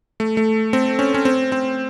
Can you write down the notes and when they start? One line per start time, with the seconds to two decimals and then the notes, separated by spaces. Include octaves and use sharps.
0.20 A3
0.37 A3
0.73 C4
0.99 C#4
1.14 C#4
1.25 C4
1.52 C4